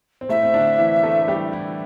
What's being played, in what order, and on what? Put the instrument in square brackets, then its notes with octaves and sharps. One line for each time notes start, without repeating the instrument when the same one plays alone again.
[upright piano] C4
[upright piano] A2 A3 [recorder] E5
[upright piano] C4
D3 D4
E3 E4
A3 A4
A4
G3 G4
E3 E4